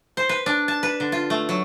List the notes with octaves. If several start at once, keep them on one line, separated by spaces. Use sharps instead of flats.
C5
B4
D4
A5
B4
D3
F4
A3
F#3